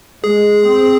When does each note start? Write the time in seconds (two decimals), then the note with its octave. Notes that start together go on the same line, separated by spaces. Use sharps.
0.24 G#3 G#4
0.68 C4